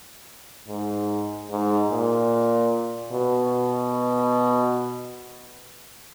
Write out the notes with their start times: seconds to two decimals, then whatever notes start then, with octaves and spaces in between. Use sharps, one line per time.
0.68 G#2
1.51 G#2
1.91 A#2
3.12 B2